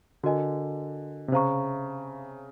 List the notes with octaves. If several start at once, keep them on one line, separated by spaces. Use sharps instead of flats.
D3 F#4 A#4 D#5 G#5
C3
C#3 C5 F5 A#5 C#6